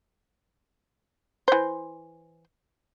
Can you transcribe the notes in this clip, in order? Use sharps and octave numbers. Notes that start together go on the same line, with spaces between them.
E3 C5